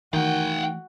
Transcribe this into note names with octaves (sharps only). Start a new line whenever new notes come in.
D#3 E3 A3 F#4 F#5 G5